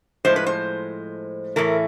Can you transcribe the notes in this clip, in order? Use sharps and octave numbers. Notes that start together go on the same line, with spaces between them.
A2 F3 G#3 C5
B4
C5
A2 E3 A3 A#4